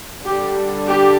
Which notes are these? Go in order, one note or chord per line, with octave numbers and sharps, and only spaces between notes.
D3 G3 D4 G4
G4